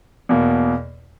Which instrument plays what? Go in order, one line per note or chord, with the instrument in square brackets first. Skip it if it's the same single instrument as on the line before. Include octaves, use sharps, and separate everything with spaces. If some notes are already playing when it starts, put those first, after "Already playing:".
[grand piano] E2 B2 A#3